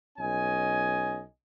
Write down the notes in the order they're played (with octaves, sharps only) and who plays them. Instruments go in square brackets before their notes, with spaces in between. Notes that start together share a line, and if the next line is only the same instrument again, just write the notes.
[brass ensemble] B1 C#4 D#5 G#5